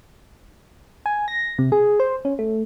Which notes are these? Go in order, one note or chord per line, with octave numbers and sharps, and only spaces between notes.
G#5
A#6
C3
G#4
C5
C#4
A3